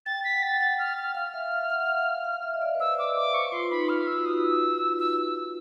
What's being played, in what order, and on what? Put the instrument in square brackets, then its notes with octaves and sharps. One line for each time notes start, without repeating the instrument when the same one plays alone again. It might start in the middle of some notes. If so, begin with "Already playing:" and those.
[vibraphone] G5 [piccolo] A6
[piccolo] B6
[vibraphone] F#5
[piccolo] A6
[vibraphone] F#5 [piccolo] A6
[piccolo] F6
F6
[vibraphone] F5 [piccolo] F6
[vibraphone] E5
F5
F#5
F#5
F5
E5
D#5
D5
B4
[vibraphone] C5 [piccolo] E6
[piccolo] D6
D6
[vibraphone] B4 [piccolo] C#6
[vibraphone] F4 [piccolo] C6
[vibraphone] D#4 [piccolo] B5
[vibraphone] F4 [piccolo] F6
[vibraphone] F4 [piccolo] E6
[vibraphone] F#4
[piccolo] D#6
E6
E6